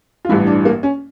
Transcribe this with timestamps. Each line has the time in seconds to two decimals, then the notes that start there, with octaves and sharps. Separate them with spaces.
0.25 F4
0.29 A1 G2 E3 E4
0.47 D4
0.65 A#3
0.83 C#4